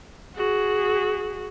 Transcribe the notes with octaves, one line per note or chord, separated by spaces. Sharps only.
F#4 G#4